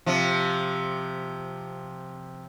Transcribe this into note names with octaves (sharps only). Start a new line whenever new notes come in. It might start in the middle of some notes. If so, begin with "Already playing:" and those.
C3 F3